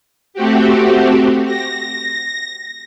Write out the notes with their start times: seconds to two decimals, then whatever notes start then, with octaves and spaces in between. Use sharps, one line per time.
0.34 A3 C4 F#4 G4
1.46 A#6